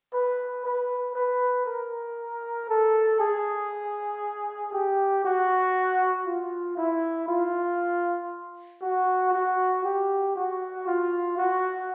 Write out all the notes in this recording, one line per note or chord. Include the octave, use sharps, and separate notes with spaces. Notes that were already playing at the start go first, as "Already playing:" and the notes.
B4
B4
B4
A#4
A4
G#4
G4
F#4
F4
E4
F4
F#4
F#4
G4
F#4
F4
F#4